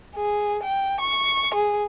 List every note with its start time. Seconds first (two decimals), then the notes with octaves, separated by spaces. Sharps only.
0.16 G#4
0.63 G5
1.01 C#6
1.54 G#4